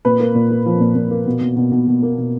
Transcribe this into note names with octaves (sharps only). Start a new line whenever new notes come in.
A#2 B4
A#3
A#2
A#3
F3
A#2
A#2
A#3
B2
B2
B2
B2
B2
A#3
B2